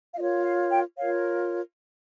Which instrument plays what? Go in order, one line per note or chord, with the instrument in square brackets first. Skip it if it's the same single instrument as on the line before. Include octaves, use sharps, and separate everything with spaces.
[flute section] F5
F4 A#4 C#5 D#5
F5
G5
F4 A#4 C#5 F5